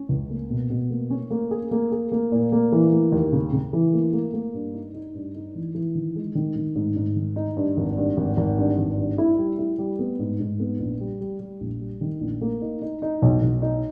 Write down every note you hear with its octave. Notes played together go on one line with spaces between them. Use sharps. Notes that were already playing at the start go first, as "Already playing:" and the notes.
Already playing: C#4
C#2
A#3
B2
B2
A#3
C#4
A#3
G#4
A#3
G#4
A#3
A#2
A#3
E3
A#3
D#2
C#3
C#3
E3
A#3
A#3
A#3
G2
D#4
D#4
G2
D#4
E3
E3
D#3
G#3
D#3
D#3
G#2
G#2
D#3
D#4
G2
G#1
G2
G#1
G#1
G2
G#1
G2
E4
G3
E4
G3
B3
G#2
G#2
B3
A#1
G3
G3
G3
A#1
G3
D#3
A#1
A#3
D#4
D#4
D#4
B1
B1
D#4